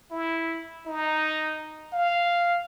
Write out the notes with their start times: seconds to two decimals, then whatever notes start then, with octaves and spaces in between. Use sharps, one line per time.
0.12 E4
0.86 D#4
1.93 F5